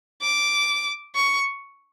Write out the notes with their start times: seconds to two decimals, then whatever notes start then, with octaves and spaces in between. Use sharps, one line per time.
0.22 D6
1.15 C#6